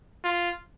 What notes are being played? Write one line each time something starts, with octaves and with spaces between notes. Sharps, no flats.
F4